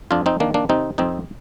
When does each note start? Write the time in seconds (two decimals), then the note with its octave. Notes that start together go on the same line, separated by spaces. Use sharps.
0.11 F2 D4 F4
0.26 C4 D#4
0.40 D#3 A#3 D4
0.54 A#3 D4
0.69 C3 C4 D#4
0.98 F2 C4 D#4